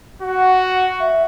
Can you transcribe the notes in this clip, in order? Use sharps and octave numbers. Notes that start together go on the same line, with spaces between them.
F#4 F#5
E5